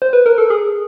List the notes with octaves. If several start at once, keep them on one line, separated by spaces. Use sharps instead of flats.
C5
B4
A#4
A4
G#4